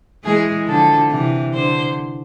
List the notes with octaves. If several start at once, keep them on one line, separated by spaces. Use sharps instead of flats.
E3 G#3 G#4
D3 F3 A4
C3 E3
D3 C5